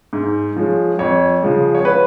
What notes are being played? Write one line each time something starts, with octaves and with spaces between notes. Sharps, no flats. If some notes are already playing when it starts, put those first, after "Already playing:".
G#2
F3 G#3 C#4
F2 C#5
C#3 F3 G#3
C#5
B4